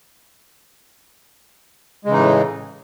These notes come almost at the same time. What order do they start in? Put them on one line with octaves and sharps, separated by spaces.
G#3 C#3 E3 D#4 A2